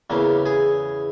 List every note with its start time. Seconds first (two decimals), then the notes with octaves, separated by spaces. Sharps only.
0.10 E2 C#3 E3 A#3
0.46 G#4